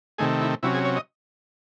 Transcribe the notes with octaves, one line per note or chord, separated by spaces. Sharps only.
C3 D#3 A3 G#4
E4
C3 F#3 C#4 E4
G#4
C#5
D#5